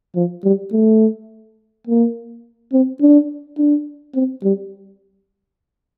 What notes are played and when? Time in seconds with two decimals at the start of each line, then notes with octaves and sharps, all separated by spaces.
0.16 F3
0.44 G3
0.72 A3
1.87 A#3
2.73 C4
3.01 D4
3.58 D4
4.15 C4
4.43 G3